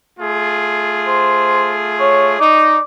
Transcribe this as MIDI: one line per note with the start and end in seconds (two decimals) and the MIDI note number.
0.19 2.39 57
0.19 2.39 65
0.19 2.39 68
1.07 1.71 72
2.00 2.33 73
2.40 2.77 63
2.40 2.82 74